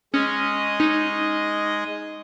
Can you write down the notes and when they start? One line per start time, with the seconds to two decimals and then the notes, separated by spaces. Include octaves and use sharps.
0.14 G#3 C#4 D#5
0.80 C#4 D#4